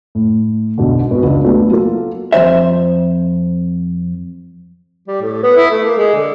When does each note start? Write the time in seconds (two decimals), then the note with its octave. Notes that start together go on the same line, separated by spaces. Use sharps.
0.15 A2
0.78 B1 G#2 B2 D3
1.10 G#2 B3 C4 F#4
1.23 C#2 D4
1.45 F#3 A3 B3 D4 F4
1.70 F#3 A#3 F4 A4
2.32 F2 E3 C5 E5
5.08 G3
5.22 A2
5.43 B3
5.57 E4
5.71 A3
5.85 A#3
5.98 G#3
6.15 D3